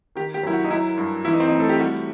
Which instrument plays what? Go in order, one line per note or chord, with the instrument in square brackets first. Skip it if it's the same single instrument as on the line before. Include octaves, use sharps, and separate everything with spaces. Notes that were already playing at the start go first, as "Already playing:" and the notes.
[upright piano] D#3 G4
G4
F#2 E4
F#4
D#4
F#3 E4
G2
E3 E4
D#4
C4
D#4
A2
A4
G4
G3 F#4